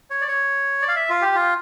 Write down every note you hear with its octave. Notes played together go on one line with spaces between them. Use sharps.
C#5
D5
C#5
D5
F5
E5
F4
G4
F4